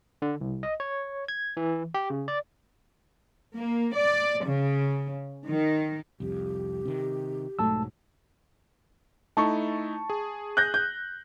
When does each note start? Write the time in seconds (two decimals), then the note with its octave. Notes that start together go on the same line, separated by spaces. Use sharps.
0.22 D3
0.41 C2
0.63 D#5
0.80 C#5
1.28 G#6
1.57 E3
1.94 G4
2.10 C#3
2.28 D5
3.57 A#3
3.95 D5
4.46 C#3
5.48 D#3
6.20 C2 F2 G4
6.85 C3 D#3
7.59 B1 G#2 F#3 A3 A5 E6
9.37 A3 D#4 E4 A5 C#6
10.10 G#4
10.57 F#6 G6 A#6
10.74 G6